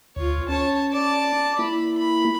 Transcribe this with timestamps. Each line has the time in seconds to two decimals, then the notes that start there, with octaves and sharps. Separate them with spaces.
0.16 D2 F4 C#5
0.49 C#4 C#5 A5
0.91 D5 A5
1.59 A#3 E4 B5
1.98 B5